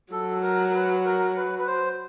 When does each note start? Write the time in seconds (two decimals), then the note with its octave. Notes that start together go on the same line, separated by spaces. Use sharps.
0.12 F#3 A4
0.43 A#4
0.70 A#4
0.74 B4
1.05 A#4
1.37 B4
1.59 B4
1.67 C5